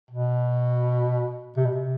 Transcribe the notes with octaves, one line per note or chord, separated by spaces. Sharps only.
B2
C3
B2
C3